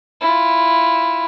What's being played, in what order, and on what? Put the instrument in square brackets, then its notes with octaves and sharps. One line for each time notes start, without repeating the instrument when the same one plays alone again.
[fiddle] E4 F4